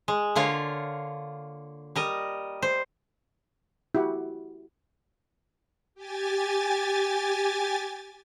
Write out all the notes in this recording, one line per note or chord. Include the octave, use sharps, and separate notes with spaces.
G#3
D3 A#3 F4 C#5
G3 A#4 D#5
C5
E4 F#4 G4 F#5
G4 G#5 A6